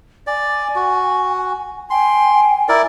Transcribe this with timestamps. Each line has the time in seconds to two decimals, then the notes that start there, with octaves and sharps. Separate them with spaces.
0.27 D5 G#5
0.76 F#4
1.90 G5 G#5 C6
2.69 E4 A#4 D5